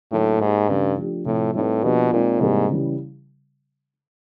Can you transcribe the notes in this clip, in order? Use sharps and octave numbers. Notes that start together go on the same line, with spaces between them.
A2 D3 F#3 A#3 D#4
G#2 A#3 D#4 G4
G2 C#3 E3 A3 C#4
F3 A3 D4 G4
A2 C3 F3 A3
A2 G3 C4 D#4 G4 B4
B2 F3 A#3 D4 G4 B4
A#2 G#3 C4 D#4
G#2 C3 E3 G3 A#3
C#3 E3 G3